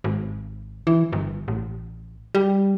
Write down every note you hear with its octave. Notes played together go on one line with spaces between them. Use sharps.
G#1
E3
G1
A1
G3